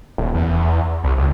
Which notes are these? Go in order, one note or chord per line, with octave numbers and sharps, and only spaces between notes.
D#1
E2
C2
C#2